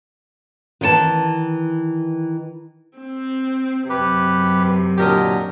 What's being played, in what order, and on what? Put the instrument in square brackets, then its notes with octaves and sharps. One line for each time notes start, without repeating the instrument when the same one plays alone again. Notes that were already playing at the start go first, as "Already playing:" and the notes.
[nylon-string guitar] D#3 E3 F#5 A5
[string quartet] C4
[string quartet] F#2 C3 [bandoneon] G4 B4
[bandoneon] A#2 D3 F#3 [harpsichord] G4 A#4 D#5